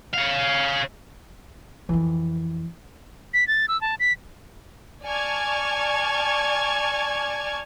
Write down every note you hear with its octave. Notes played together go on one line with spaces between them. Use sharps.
C#5 F5
F2 E3
B6
A6
E6
A5
B6
D5 G#5 A5 C#6 F6 G#6